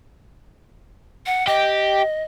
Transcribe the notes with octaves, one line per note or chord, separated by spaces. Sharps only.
F#5
G4 D#5